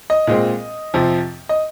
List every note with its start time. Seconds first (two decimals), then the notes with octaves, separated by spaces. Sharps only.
0.10 D#5
0.27 A#2 G#3 C4
0.94 F2 C3 F3 C4
1.49 D#5